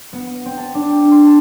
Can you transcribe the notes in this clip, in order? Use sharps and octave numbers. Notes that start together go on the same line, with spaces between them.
B3
D#7
C4
A5
D4
G5
C6
A5